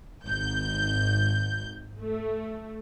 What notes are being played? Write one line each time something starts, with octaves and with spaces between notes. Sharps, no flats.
G#1 G6
A3